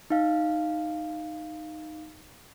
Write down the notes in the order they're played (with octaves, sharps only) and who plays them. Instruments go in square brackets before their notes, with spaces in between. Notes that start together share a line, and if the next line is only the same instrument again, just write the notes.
[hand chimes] D#4 F5